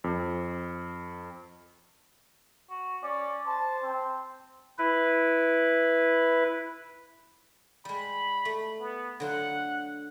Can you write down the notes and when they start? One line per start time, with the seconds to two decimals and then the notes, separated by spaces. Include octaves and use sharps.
0.04 F2
2.70 F#4
3.03 C#4 D5
3.47 C5 A5
3.83 C4
4.78 E4 B4
7.85 G3 G#3 B5
8.45 A3
8.80 B3
9.20 D3 F#3 F4 F#5